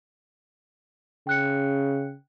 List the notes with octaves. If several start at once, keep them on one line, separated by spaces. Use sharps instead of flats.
C#3 G5 F#6 C#7